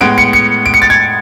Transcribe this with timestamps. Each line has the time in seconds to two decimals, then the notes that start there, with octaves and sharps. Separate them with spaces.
0.01 A2 G#3 B3 D7
0.18 C#7
0.33 C#7
0.66 D7
0.74 C#7
0.82 A6
0.90 G#6